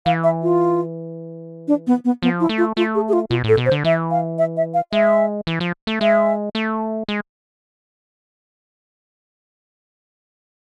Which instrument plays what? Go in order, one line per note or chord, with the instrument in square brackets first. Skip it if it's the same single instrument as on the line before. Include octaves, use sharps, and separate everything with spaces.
[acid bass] E3 [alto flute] F5
[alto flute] E5
F4
D4
B3
B3
[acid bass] F3 [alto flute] B3
[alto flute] E4
[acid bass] A3
[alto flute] F4
[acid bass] A3 [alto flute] F4
[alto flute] G#4
G#4
F4
[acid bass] B2 [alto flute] F4
[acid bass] A2 [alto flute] A4
[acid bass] B2
[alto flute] C5
[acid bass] D3
[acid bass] E3 [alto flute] E5
[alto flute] F5
E5
E5
F5
[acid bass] G#3 [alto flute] E5
[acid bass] E3
F3
A3
[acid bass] G#3 [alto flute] E5
[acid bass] A3
G#3